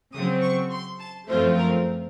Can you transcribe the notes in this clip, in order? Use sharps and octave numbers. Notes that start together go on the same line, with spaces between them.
C#3 F#3 C4 D#6
C#6
C6
A5
F#2 F3 A3 C4 F4 C5
A#4